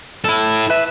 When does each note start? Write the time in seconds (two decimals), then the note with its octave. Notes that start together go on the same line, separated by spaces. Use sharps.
0.24 E4 A4
0.70 B4 E5